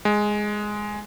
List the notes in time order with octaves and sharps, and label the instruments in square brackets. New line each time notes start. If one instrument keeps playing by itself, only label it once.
[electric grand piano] G#3